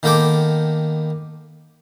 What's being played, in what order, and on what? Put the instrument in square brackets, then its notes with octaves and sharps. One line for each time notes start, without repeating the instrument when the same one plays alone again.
[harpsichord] D#3 A#3 B3 A4 G5 D6